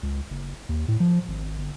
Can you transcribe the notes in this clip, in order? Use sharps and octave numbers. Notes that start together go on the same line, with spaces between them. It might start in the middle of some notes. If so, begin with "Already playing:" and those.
C#2
F#1
D#2
A2
F3
G#1
G1